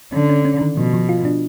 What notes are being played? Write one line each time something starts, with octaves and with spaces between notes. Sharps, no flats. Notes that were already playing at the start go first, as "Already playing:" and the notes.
D3 C#4
C#4
C#4
D#3
B2 F3
F3
F4
D4